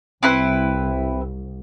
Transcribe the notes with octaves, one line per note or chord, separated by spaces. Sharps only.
C2 C4 E4 B4